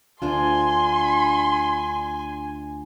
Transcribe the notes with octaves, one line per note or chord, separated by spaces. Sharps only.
D2 D4 F4 G#5 C6